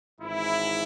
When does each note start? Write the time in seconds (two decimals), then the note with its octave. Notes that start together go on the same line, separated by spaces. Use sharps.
0.19 G#1 G#2 E3 E4